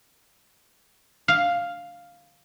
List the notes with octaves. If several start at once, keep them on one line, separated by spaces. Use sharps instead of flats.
F5